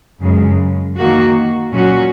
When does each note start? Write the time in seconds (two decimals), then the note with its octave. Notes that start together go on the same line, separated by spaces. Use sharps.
0.21 F#2 C#3 G#3
0.96 D#3 A#3 F#4
1.72 A#2 F#3 C#4 F#4